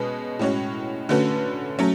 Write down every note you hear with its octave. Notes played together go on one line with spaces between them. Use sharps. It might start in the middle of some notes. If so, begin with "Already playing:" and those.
Already playing: B2 G#3 C#4 G#4 B4
A2 G#3 C#4 F#4 C#5
D3 A3 C#4 F#4 B4
F#3 A3 C#4